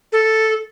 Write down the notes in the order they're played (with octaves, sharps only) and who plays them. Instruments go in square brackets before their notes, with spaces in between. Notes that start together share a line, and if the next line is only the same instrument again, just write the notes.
[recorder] A4